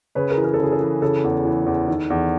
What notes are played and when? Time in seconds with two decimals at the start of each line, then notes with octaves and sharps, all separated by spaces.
0.15 C#3 B4 C#5
0.30 G#4 A#4
0.37 E3
0.44 A#4
0.54 A4
0.59 C#3 G#4
0.72 A4
0.80 E3
1.02 C#3 A4
1.24 E2
1.45 E3
1.66 E2
1.88 D#3
2.10 E2